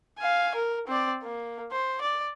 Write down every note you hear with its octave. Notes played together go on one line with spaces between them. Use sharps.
F5 G#5
A#4
C4 D5
A#3
C5
D5